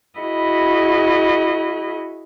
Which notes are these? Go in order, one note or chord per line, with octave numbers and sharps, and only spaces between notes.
E4 F#4 G#4 D#5 B5